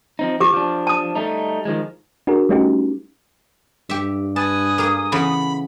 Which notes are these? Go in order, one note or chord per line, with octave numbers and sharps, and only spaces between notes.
F3 C4 D#4
F3 G4 D6
F3 D4
A5 D#6
G3 A3 D#4
D#3 F3 G#3
D4 F#4 G#4 A#4
G3 A3 C#4 D#4 F#4 G4
G2 G4 E5
B4 G#5 A5 D#6
A#3 G#4
C#3 E3 B3 B5